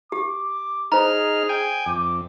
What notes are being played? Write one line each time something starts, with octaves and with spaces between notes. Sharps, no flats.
G4 D6
D#4 G#4 C5 A#5 F6
G5 G#5
F2 D6